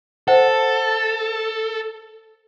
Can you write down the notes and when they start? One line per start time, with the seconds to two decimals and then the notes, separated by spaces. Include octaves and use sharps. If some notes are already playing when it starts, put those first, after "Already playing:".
0.28 A4 C5 E5 F#5